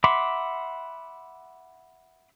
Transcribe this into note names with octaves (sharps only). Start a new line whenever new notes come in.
E5 F#5 B5 C6 D6